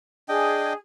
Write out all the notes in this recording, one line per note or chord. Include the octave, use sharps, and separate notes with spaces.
D4 G#4 D#5 G5